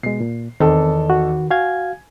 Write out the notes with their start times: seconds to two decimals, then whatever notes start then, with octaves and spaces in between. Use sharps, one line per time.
0.03 B2 G#3 C7
0.21 A#2
0.60 E2 D#3 C4 A4 D#5
1.10 F#4
1.51 F#4 F5 G#5 G#6